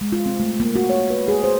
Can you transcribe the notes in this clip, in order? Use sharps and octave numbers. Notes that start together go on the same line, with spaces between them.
G#3
F4
C4
A3
A#3
F#4
C#5
B4
G#4
C5